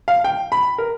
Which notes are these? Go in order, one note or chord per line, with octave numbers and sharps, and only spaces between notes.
F5
G5
B5
A#4